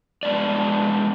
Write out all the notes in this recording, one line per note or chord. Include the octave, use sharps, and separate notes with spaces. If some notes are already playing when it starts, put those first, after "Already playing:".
G#3 B3 D4 D5